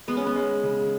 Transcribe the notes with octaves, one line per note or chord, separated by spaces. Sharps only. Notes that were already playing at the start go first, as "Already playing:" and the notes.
G#3 B3
C#4
B3
G#3
C#3